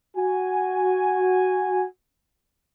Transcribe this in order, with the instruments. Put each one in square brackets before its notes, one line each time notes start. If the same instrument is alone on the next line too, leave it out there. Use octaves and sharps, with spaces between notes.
[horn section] F#4 G#5